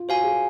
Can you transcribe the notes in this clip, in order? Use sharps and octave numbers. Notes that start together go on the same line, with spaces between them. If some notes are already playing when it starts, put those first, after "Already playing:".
Already playing: F4
F#4 C5 F5 G#5
G#4